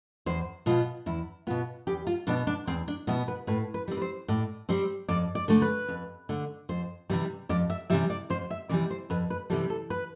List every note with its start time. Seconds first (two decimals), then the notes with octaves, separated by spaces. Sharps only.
0.26 E2 C5
0.66 B2 B3 F4
1.06 E2 E4
1.47 B2 B3 F4
1.87 E2 G4
2.07 F4
2.27 B2 B3 D4
2.47 D4
2.67 E2 C4
2.88 D4
3.07 B2 B3 E4
3.28 B4
3.47 A2 B4
3.74 B4
3.88 G3 C4
3.97 B4
4.02 C5
4.28 A2 D5
4.69 G3 C4 C5
5.09 F2 D5
5.35 D5
5.48 D3 A3
5.62 B4
5.88 F2
6.29 D3 A3
6.69 F2 C5
7.10 C3 E3 G3
7.49 F2 D5
7.70 E5
7.90 C3 E3 G3 E5
8.10 D5
8.30 F2 C5
8.50 E5
8.69 C3 E3 G3 D5
8.90 C5
9.10 F2 B4
9.30 B4
9.50 C3 E3 G3 A4
9.70 A4
9.90 B4